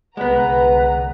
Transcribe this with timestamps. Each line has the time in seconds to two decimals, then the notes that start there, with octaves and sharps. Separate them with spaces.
0.17 C2 D3 G#3 B3 B4 F#5 A#5